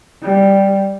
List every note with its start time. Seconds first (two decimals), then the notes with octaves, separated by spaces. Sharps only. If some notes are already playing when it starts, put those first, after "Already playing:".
0.23 G3